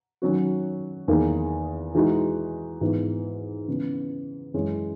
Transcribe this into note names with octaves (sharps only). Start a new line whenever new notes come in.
D#3 F#3 C#4 F#4
E2 D#3 A#3 D#4 G#4
E3 G#3 D#4 F#4
G#2 E3 B3
C#3 E3 B3
F#2 E3 G#3 C#4